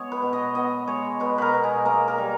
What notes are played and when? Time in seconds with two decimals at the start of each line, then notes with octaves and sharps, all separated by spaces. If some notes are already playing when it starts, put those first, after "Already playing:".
Already playing: G#3 B3 C#5 D#5
0.12 B4
0.22 B2
0.33 D#5
0.55 B3 D#5
0.87 G#3 C#5
1.20 B2 B4
1.38 A#4 B4
1.53 B2
1.64 G#4
1.85 A#3 A#4
2.08 A#4
2.18 G3